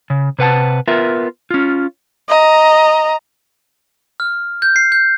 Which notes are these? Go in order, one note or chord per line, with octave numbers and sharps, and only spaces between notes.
C#3
C3 B4 F#5 A5
B3 F4 A#4 E5
C#4 F4
D#5 A#5
F6
G6
C7
G6